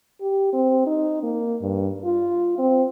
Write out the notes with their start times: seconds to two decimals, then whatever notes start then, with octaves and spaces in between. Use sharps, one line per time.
0.21 G4
0.53 C4
0.86 D#4
1.23 A#3
1.62 G2
2.05 F4
2.59 C4